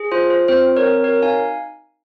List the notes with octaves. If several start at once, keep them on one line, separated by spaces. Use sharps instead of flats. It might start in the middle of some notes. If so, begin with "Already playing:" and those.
Already playing: G#4
F4 C5
F4 C5
C4 C5
C4
A#4 C#5
C4
F#4 A#4 C#5
D#4 F5 G#5